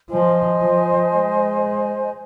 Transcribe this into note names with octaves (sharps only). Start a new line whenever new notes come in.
F3 C5 D#5 G#5
F3
G#3